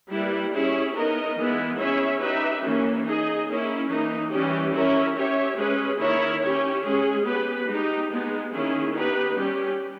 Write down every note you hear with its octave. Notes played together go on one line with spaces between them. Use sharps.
G3 A#3 E4 G4 B4
C#4 E4 G#4 C#5
B3 D#4 A#4 D#5
E3 G#3 B3 E4
C#4 E4 G#4 C#5 E5
D#4 G4 B4 E5
E3 A#3 C#4
D#4 G#4 D#5
A#3 C#4 E4
E3 A#3 D#4
E3 G3 C#4 G4
C#4 E4 A#4 C#5 E5
C#4 G4 C#5 E5
G#3 C#4 G#4 B4
D#3 A#3 E4 A#4 C#5
C#4 G4 C#5
G#3 C#4 G#4
B3 G4 B4
G#3 D#4 G4
G#3 B3 D#4
D#3 A#3 C#4 E4 G#4
B3 D#4 G4 B4
G3 C#4 G4